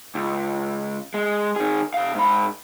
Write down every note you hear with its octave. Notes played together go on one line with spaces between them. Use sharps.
C#2
G#3
D#3 G#4
C3 F5
G#2 B5